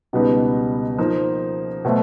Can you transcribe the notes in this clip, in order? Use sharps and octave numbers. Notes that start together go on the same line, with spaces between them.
C#2 B2 G3 B3 D#4
F3 A#3 D#4
B2 F#3 A3 C4